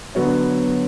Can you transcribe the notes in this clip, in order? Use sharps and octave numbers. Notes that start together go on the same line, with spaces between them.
D3 F#3 B3 F#4 C#5